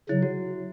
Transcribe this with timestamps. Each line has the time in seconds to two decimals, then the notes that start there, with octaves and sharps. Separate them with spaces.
0.09 C#3 F#3 E4
0.23 F#4